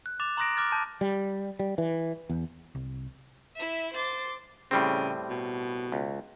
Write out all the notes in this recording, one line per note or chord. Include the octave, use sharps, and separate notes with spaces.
F#6
D6 A6 E7 F7
A#5 C6 D#6 F#6 A#6 D7
D6 F6 F#6 G#6 A6
A5 G6
G3
G3
E3
E2
C2
E4 E5
C5 C6 D6 A6
A2 C#3 G3 C4
B2
C#2